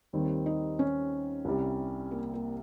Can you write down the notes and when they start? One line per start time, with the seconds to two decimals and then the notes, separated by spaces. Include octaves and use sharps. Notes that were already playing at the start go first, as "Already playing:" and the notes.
0.13 D#2 D#3 G3 C4
0.46 D#4
0.79 C#4
1.45 C2 C3 G3
2.11 A#3
2.34 A#3